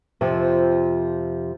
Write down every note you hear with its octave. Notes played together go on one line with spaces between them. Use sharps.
F2 C3 F3